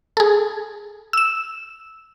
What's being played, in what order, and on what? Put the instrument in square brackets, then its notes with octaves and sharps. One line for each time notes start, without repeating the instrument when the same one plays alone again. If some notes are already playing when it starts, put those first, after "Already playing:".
[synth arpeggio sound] G#4 A4
E6 E7